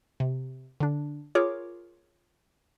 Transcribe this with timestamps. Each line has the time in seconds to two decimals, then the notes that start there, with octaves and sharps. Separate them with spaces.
0.20 C3
0.80 D3 D4
1.35 F4 G#4 A#4 C#5 D6